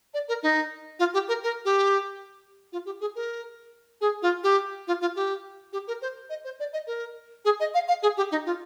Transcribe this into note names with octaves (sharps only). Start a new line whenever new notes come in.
D5
A#4
D#4
F4
G4
A#4
A#4
G4
F4
G4
G#4
A#4
G#4
F4
G4
F4
F4
G4
G4
A#4
C5
D#5
C5
D5
D#5
A#4
G#4
D#5
F5
F5
G#4
G4
D#4
F4